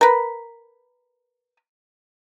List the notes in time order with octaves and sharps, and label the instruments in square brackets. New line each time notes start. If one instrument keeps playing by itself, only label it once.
[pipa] A#4 B4